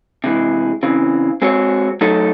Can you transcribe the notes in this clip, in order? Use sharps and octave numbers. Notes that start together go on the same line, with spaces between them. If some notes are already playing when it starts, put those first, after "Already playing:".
C3 E3 G#3
C#3 E3 C4
G#3 C4 F#4 C#5
F#3 A3 D#4 A4 C#5